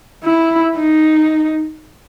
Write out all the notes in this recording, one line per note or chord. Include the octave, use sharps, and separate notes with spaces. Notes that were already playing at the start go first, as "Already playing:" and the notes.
E4
D#4